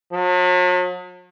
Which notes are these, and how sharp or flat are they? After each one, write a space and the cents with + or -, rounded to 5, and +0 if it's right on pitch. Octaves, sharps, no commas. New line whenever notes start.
F#3 -45